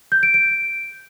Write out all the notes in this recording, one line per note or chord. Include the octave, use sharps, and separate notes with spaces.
G6
D7
D7